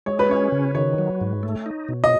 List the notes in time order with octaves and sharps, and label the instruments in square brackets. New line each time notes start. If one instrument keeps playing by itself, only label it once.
[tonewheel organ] G#3 [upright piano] C#5
[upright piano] B4
[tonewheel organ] C#4 [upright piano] C#5
[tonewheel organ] C#3
[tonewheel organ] D#3 [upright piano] C#5
[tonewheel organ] F#3
G#2
A3
D#4
B2
[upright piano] D#5